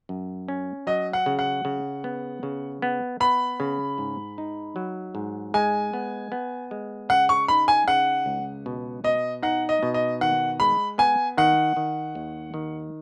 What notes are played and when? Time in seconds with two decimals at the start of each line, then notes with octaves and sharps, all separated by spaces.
0.09 F#2
0.48 C#4
0.87 F#3 D#5
1.13 F#5
1.26 C#3
1.39 F#5
1.65 C#3
2.04 B3
2.43 C#3
2.82 B3
3.20 B3 B5
3.60 C#3
3.98 G#2
4.38 D#4
4.76 F#3
5.15 G#2
5.54 G#3 G#5
5.93 B3
6.32 B3
6.71 G#3
7.09 C#3 F#5
7.29 C#6
7.48 D#4 B5
7.68 G#5
7.88 C#3 F#5
8.26 C#2
8.66 B2
9.04 B2 D#5
9.43 D#4 F#5
9.69 D#5
9.83 B2
9.94 D#5
10.21 D#3 F#5
10.60 G#3 B5
10.98 B3 G#5
11.37 D#3 F#5
11.77 D#3
12.15 D#2
12.54 D#3